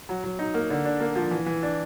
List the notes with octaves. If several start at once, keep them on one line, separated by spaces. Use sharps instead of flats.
F#3
F#3
D#4
A#3
D3
D4
A#3
F3
E3
E3
D4